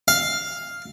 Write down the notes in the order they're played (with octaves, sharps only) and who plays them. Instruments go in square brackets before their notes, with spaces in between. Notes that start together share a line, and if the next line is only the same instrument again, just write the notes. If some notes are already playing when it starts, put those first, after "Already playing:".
[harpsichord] F5